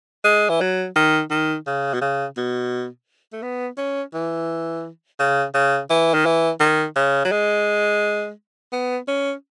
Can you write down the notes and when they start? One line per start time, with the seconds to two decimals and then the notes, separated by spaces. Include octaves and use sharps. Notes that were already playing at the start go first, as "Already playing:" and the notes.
0.24 G#3
0.49 E3
0.61 F#3
0.96 D#3
1.30 D#3
1.67 C#3
1.94 B2
2.01 C#3
2.37 B2
3.33 A3
3.43 B3
3.78 C#4
4.14 E3
5.19 C#3
5.54 C#3
5.90 E3
6.14 D#3
6.25 E3
6.60 D#3
6.96 C#3
7.25 F#3
7.32 G#3
8.72 B3
9.08 C#4